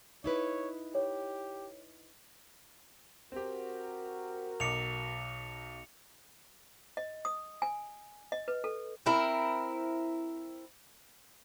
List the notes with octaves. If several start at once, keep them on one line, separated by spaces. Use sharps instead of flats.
D#4 E4 B4 C#5
G4 C#5
C4 F#4 G4 A#4
B1 D#5 D6 C#7 F7
D#5
D#6
G#5
D#5
B4
A4
C4 E4 A#4